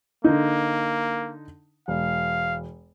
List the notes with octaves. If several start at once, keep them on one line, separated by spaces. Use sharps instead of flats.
D3 A#3 D#4
E1 F5